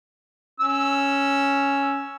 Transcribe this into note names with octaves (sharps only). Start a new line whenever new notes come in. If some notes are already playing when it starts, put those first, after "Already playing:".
C#4 E6